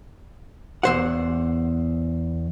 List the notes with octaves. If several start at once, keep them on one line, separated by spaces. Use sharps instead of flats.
E2 C5 F#5